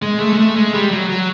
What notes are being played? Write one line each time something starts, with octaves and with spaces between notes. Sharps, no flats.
G#3
A3
G#3
A3
G#3
G3
F#3
F#3